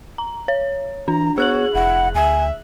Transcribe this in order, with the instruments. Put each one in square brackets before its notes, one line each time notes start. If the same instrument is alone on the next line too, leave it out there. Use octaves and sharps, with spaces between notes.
[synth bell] A#5
C#5
[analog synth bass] E3 [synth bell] D4 [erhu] A#5
[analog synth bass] B3 [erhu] F#4 [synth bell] G#4 F#6 F#7 [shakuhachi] C#5
[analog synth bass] F1 [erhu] E4 [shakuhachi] F#5
[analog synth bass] D2 [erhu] E5 [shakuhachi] G#5